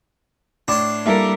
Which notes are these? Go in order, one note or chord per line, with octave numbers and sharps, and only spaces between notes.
A2 D4 C6
G3 A#3 E4 A4 A#4